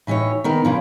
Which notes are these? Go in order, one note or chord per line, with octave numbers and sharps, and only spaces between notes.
A2 E3 D#4 F#4 C#5
D#3 B3 D#4 A#4
C#3 E3 F3